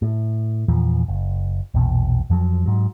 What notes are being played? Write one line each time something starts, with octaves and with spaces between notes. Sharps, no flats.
A2
E2 A#2 E3 F3
F#1
A#1 E2 B2
F2 F3 F#3
G#2 F#3